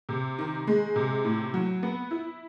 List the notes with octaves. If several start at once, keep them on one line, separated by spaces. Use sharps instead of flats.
C3
D#3
G#3
C3
A2
F#3
B3
E4